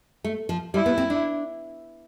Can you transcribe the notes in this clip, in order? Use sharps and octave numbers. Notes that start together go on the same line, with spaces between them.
A3
F3
G3 E4
B3
C4
D4